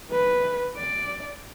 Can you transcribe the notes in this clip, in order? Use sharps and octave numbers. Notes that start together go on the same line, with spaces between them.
B4
D5